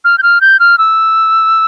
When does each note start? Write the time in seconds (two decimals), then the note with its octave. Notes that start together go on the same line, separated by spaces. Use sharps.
0.05 F6
0.18 G6
0.23 F6
0.41 G6
0.60 F6
0.78 E6